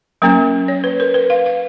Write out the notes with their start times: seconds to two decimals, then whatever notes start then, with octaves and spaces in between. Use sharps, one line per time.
0.22 F#3 A#3 C#4 A#4
0.68 C#5
0.84 B4
1.00 A#4
1.14 B4
1.30 F5
1.46 F5